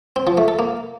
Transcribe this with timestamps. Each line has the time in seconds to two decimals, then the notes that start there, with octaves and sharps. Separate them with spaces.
0.16 C4
0.27 F3
0.37 A3
0.48 A4
0.59 A#3